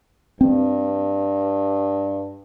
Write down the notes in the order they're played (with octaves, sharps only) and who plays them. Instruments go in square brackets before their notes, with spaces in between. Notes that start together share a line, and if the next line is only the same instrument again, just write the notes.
[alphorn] G2 [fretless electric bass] C4